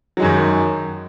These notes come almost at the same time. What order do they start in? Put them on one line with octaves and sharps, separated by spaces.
F#3 G#3 F#2 D#3